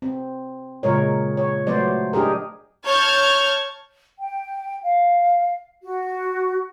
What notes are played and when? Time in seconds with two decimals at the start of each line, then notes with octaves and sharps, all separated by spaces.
0.02 C4
0.83 A#2 C#3 G#3 A#4 C#5
1.37 C#5
1.67 F#3 A3 B3 C5 D5
2.13 D4 D#4 G4 G#4 A#4
2.84 C#5 A5 F6 G6 G#6
4.19 G5
4.83 F5
5.83 F#4